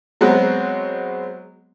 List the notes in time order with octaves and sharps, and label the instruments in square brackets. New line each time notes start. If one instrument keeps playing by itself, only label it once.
[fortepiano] F#3 G#3 B3 C4